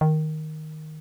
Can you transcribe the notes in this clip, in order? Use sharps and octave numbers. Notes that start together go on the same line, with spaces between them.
D#3